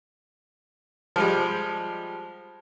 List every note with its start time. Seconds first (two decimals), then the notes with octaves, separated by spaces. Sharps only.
1.16 F3 G3 G#3